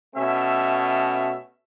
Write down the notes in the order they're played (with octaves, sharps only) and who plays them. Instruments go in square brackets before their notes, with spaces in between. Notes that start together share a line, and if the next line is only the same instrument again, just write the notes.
[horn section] B2 A3 C#4 E5